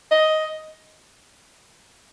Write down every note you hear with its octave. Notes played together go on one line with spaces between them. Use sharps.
D#5